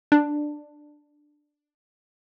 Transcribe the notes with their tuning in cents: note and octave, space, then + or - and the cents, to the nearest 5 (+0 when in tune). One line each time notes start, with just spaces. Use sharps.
D4 +10